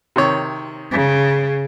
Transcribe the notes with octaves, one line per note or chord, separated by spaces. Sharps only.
C3 D#3 C#5
C#3